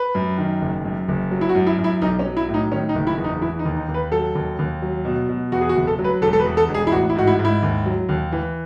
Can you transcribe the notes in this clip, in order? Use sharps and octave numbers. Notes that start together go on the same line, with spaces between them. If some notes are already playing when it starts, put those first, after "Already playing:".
Already playing: B4
F#2
D#3
F#1
F#2
F#1
F#3
E4
F#4
F#2
E4
F#2
E4
B1 D#4
C#4
F#3
E4
A2
D#4
D#3 C#4
D#4
F#1
E4
E2
D#4
E3 E4
D#4
D#2
D#4
D#2
B4
F#3 A4
D#2
D#2
F#3
B2
B2
E2 F#4
G#4
F#4
F#1
A4
F#3
B4
E1 A4
A4
B4
E2
A4
E1
G#4
E4
A1 F#4
E4
G#2 F#4
E4
G#2
E4
D#2
F#3
D#2
E3